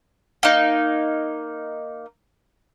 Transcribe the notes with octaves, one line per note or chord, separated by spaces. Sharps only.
A#3 D#4